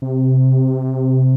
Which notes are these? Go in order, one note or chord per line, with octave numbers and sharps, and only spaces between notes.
C3